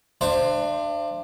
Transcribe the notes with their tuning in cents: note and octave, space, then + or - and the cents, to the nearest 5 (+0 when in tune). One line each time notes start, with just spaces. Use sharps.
D4 +25 C5 +0 F5 -45